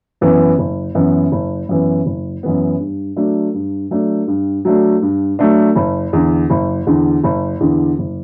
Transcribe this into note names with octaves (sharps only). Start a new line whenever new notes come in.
F#2 E3 B3
F#1
F#2 E3 B3
F#1
F#2 E3 B3
F#1
F#2 E3 B3
G2
F#3 A3 D4
G2
F#3 A3 D4
G2
F#3 A3 D4
G2
F#3 A3 D4
F#1
E2 D3
F#1
E2 D3
F#1
E2 D3
F#1